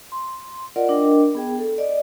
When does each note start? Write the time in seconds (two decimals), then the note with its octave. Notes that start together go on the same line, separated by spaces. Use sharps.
0.12 C6
0.76 F4 A#4 D5 D#5 F#5
0.89 D4 A#4 D#5 G5
1.35 B3 G#4 G5
1.59 A4
1.78 D5 D#5